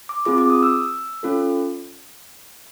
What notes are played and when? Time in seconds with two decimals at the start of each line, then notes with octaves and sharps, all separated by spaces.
0.09 D6
0.25 C4 F4 G#4 D6
0.38 D6
0.50 D#6
0.63 E6
1.23 C#4 F4 A4